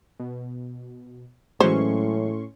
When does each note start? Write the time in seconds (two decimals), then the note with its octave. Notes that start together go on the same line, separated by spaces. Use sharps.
0.20 B2
1.60 A2 E3 F#3 G#3 C#4 C5 C6 C#6